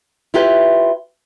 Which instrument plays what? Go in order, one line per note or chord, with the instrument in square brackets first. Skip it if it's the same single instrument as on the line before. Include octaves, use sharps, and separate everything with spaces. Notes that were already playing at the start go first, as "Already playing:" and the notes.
[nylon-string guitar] E4 F4 G4 B4 C#5